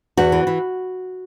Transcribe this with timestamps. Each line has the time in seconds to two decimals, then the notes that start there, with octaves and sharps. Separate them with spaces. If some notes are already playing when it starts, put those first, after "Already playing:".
0.17 E2 F#4
0.32 E3
0.47 E3